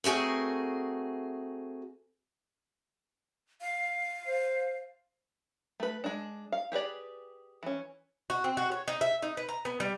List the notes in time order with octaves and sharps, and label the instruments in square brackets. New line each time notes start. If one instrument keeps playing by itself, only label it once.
[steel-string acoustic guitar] A3 C4 F#4 G#4 A#4
[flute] F5
[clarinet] C5
[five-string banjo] A3 B4
G#3 D4
F5
G4 G#4 B4 D5
E3 C#4
[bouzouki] F#4
C4
F#4
C#5
D#4
E5
D#4
B4
A#5
B3
G3